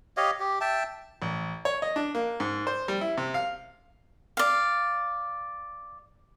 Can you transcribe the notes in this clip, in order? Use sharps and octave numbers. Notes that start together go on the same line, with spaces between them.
G4 C#5 D#5 F5
G4
E5 G5 A5
A1
C#5
D#5
D4
A#3
G#2
C5
G3
E4
C3
F5
D5 F5